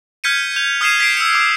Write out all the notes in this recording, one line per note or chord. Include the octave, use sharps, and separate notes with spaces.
F6 G6 G#6 B6 C#7 D#7
G6 F7
D#6 F6 G#6 C7 D#7 E7
G#6 B6 C7 D7
E6 C#7
D6